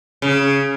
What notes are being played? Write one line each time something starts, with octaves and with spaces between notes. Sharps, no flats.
C#3